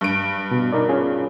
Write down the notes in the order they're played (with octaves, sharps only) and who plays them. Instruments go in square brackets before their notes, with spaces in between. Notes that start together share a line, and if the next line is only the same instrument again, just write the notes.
[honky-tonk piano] G2 D7
[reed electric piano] B2
D#4 A#4 D5
C#4 F4 G#4